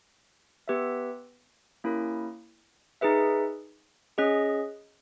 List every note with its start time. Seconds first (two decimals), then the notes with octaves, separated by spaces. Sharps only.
0.68 B3 G4 B4 E5
1.84 A#3 C#4 E4 G4 A#4
3.01 D#4 G#4 B4 E5
4.18 C#4 G#4 D#5